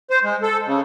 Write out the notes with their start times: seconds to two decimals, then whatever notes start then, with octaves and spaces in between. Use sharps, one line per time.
0.10 C5
0.24 G#3
0.42 A4
0.67 C#3